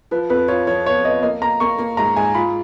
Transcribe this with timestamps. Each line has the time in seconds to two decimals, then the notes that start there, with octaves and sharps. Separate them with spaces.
0.11 F3 B4
0.30 F2 B4
0.48 F4 C#5
0.67 F3 C#5
0.86 B3 C#5
1.05 B3 D#5
1.23 A#3 D#5
1.42 A#3 A#5
1.60 A#3 C#6
1.78 A#3
1.97 G#2 A#5
2.16 G#2 G#5
2.34 F4 B5